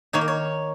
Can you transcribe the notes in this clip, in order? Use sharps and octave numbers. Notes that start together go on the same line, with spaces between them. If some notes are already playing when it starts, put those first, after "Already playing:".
D#3 A#3 D#4 C#5
A#4
C#5